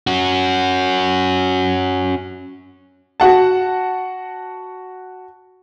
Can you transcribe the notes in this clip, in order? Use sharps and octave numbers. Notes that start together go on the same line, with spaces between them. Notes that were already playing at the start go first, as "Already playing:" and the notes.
C#4 F#4
F#4 F#5 A5